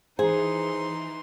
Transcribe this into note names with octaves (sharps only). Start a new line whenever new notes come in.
E3 D#4 G#4 C5 C6